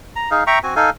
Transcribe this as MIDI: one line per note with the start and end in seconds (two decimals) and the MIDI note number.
0.16 0.30 82
0.31 0.44 63
0.31 0.44 68
0.31 0.44 77
0.47 0.59 76
0.47 0.59 79
0.47 0.59 82
0.47 0.59 85
0.63 0.75 60
0.63 0.75 66
0.63 0.75 80
0.76 0.90 63
0.76 0.90 69
0.76 0.90 77
0.76 0.90 80